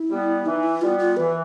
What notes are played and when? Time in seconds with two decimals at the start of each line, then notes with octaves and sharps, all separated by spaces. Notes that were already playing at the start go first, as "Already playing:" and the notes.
Already playing: E4
0.10 G3 B3
0.46 E3 D#4
0.63 E4
0.81 G3 B3 F4
0.99 F4
1.17 E3 B4